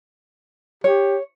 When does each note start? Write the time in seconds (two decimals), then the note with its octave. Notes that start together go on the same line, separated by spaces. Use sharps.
0.84 G4 C#5